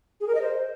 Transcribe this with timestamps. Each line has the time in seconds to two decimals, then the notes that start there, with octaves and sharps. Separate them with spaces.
0.20 G#4
0.28 A#4
0.35 D#5
0.42 C5